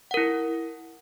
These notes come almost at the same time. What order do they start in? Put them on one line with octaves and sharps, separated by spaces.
F#5 A#4 E4